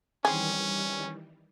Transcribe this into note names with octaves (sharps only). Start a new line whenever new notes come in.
D#3 E3 G3 C4 C#4 G#4